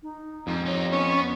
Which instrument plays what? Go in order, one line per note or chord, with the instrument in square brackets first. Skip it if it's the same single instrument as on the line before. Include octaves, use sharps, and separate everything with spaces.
[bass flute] D#4
[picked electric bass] F2 [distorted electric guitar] G#2
[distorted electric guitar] D#4 G4 [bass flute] C#5
[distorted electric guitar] B3 [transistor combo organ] C#4